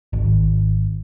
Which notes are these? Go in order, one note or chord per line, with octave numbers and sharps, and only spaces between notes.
G#1